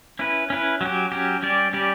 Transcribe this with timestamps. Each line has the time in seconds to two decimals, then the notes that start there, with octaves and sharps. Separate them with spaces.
0.19 C#4 E4 B4
0.50 C#4 E4 B4
0.81 F#3 C#4 G4
1.12 F#3 C#4 G4
1.43 G3 C#4 G4 D5
1.73 G3 C#4 G4 D5